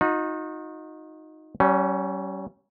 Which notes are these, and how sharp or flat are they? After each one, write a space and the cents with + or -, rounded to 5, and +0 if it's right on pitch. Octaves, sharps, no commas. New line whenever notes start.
D#4 +5 F#4 -45
G3 -40 C#4 +0